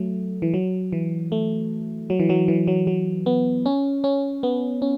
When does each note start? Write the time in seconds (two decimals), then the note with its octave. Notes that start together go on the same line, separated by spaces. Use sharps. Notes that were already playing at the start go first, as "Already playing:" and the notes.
Already playing: F#3 A3
0.42 E3
0.54 F#3
0.92 E3
1.32 A3
2.10 F#3
2.19 E3
2.30 F#3
2.48 E3
2.67 F#3
2.87 F#3
3.26 B3
3.66 C#4
4.04 C#4
4.43 B3
4.82 C#4